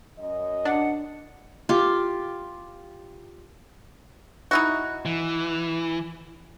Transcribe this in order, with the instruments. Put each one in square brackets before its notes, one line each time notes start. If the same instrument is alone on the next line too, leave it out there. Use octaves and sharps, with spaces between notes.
[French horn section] F#2 D#5
[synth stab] D4 [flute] F#5
[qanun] F4 G4
[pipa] D#4 E4 F#4
[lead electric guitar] E3